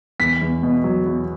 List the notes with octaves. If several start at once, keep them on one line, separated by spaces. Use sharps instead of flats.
E2 B6
E2
B2
F#3
E2